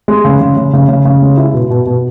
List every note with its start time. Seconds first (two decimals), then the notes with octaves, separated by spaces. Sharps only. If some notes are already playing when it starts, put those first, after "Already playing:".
0.08 G#3
0.25 C#3
0.41 C#3
0.57 C#3
0.73 C#3
0.89 C#3
1.05 C#3
1.22 G#3
1.37 E4
1.54 B2
1.70 B2
1.86 B2